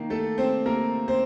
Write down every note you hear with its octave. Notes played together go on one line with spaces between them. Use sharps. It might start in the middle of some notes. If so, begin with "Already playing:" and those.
Already playing: D#3 A#3
A3 A4
C4 C5
A#3 A#4
C4 C5